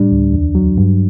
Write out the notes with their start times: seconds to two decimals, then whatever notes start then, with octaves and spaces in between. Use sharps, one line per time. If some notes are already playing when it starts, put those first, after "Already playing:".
Already playing: A2 G3 D4
0.11 D2
0.33 E2
0.55 F#3
0.78 G2